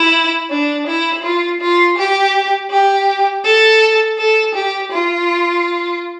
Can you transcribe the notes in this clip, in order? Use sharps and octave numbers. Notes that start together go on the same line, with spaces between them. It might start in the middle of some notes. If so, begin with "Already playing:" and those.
Already playing: E4
D4
E4
F4
F4
G4
G4
A4
A4
G4
F4